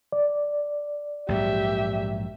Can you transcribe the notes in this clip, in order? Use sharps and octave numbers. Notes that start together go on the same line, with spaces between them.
D5
A#1 G#2 F#3 G4 E5